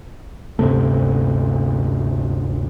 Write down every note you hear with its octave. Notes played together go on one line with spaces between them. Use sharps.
D2 G2 C3 A3